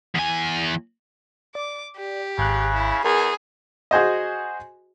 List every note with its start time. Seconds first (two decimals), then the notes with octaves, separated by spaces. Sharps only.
0.15 E2 G#5
1.55 D5 D6
1.96 G4
2.38 G#1 C#3 F#6
2.74 E4
3.05 E2 G#4 A#4
3.91 F#4 G#4 C5 D#5